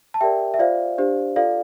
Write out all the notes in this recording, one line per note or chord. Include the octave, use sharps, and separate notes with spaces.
A5
G4 A#4 D5 E5 G5
E5
F4 C5 D5 F5
D4 G4 C5
F4 A4 D5 F5